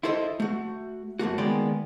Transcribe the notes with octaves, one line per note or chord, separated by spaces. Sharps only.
E4 F4 A4 C5 C#5 D#5
A3 F#4
F#2 A3 A#3 F#4
D#3 G#3 A#3 B3 D5 G5